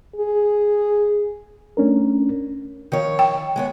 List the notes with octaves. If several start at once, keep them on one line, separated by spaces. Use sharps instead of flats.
G#4
A3 C#4 D4 A#4
D#3 F3 C#5
G5
G#3 B3 C#5